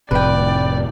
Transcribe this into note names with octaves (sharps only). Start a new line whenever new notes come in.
F1 F2 A2 C3 B4 D5 G5